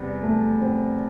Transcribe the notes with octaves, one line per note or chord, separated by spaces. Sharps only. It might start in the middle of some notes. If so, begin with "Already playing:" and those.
Already playing: E2 C3 G3
A3
C4